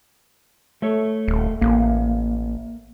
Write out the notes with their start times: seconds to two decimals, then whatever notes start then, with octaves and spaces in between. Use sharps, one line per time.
0.82 A3 A4 C#5
1.28 D#1
1.61 A1 A#3